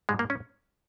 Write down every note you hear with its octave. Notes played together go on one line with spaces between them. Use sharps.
G#2 G3 G#3
A#3
C#4